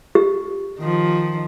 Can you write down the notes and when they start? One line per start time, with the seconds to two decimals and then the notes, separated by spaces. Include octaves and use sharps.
0.15 G4
0.79 D#3 F3